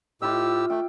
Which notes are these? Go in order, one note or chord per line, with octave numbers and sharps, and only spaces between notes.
A2 F4 G4 E5 E6
A3 G5 D6